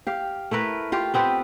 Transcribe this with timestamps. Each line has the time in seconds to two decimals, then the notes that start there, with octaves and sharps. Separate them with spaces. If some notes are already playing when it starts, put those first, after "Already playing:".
0.07 G4 F5
0.51 A3 E4 A#4 B4
0.92 F4 G4 F5
1.14 B3 C4 G4 B4